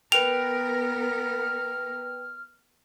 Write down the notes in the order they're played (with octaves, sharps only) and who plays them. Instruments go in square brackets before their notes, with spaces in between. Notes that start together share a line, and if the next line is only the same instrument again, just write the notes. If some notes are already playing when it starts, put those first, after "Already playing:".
[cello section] B3 A#4 [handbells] B4 G5 [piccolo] F6 [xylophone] F7